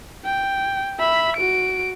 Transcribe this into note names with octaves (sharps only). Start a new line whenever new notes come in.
G5
E5 B5
F#4 D7